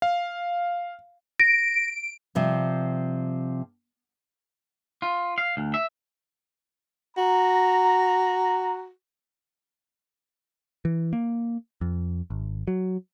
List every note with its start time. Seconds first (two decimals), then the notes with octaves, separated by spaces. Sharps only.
0.02 F5
1.40 A#6 D7
2.35 C3 F3 G3
5.02 F4
5.38 F5
5.57 D2
5.74 E5
7.17 F#4 A#5
10.85 E3
11.13 A#3
11.81 F2
12.30 G#1
12.68 F#3